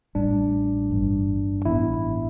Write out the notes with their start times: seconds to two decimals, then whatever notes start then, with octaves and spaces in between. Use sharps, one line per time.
0.15 A1 A2 G3 D4
0.90 G1 G2 E3 G3
1.65 A1 A2 E3 B3 E4